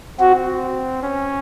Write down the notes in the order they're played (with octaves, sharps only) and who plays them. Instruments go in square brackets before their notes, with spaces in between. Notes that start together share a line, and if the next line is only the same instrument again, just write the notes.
[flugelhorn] C4 [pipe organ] F#4
[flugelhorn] C#4